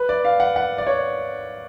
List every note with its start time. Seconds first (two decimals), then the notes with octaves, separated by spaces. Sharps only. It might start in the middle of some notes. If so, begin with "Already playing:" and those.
Already playing: B4
0.09 D5
0.25 F5
0.40 F#5
0.56 F#5
0.78 D5
0.87 C#5